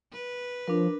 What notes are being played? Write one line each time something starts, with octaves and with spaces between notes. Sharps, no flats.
B4
F3 D4 A#4